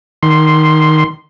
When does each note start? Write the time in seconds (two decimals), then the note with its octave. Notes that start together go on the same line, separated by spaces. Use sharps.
0.23 D#3 C6